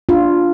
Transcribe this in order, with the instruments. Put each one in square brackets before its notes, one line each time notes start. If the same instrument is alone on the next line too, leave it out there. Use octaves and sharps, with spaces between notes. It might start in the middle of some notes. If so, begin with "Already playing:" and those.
[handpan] A#3 D4 F4